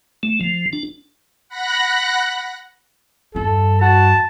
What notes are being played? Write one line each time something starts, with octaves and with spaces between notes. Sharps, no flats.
A3
F3
D4
F#5 B5 F#6 A#6
E2 G2 A4
F#4 A5